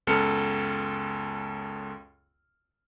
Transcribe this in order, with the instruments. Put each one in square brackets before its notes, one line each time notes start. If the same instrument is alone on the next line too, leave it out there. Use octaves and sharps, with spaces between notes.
[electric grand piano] C#2 F#2 B3 A4 F6 C#7